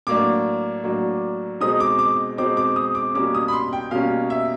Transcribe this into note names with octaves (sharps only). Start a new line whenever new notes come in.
A2 F#3 A#3 D4 D6
A2 F#3 A#3 D4
B2 G#3 C4 D#4 D#6
D6
D6
B2 G#3 C4 D#4 D6
D6
D#6
D6
B2 G3 A#3 C#4 D6
D#6
B5
C6
G5
B2 G3 A#3 C#4 F5
E5